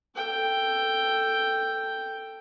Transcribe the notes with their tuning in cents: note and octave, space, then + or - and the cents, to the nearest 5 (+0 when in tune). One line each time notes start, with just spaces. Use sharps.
A4 +10 G5 +0